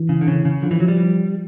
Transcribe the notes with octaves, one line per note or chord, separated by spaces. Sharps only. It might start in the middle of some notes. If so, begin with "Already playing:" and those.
Already playing: E3
C#3
D3
C#3
C#3
D3 F3
E3
F#3
G3